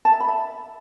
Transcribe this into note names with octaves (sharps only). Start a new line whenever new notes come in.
A5
E5
B5
E5